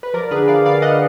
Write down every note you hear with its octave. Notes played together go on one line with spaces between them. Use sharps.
B4
F3 A#4 D5
D3 G#4 B4
F3 D5 F5
D3 D5 F5
D#5 F#5